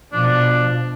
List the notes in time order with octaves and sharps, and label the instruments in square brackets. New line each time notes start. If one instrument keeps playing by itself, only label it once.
[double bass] B2 F3 [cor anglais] D4